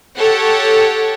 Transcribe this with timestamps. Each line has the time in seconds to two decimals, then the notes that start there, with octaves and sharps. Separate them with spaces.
0.17 G4 A4 C#5 F#5